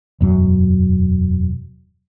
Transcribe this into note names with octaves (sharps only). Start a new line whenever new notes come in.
E1 F#2 F#3